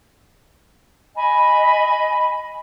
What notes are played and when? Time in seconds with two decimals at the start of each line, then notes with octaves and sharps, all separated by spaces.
1.15 D#5 G#5 B5